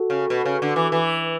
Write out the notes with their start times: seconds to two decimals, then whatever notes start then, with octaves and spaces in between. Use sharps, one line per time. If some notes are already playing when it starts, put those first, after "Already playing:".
Already playing: F#4 A4
0.10 C#3
0.30 B2
0.45 C#3
0.62 D3
0.76 E3
0.92 E3